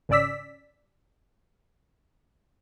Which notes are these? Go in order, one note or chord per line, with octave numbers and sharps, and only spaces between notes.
G#1 C#3 C#4 D5 E6 B6